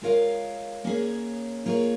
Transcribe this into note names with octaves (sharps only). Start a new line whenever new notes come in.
G#3 F4 A#4 C#5 F5
A#3 C#4 G#4 C#5
A#3 F4 G#4 C#5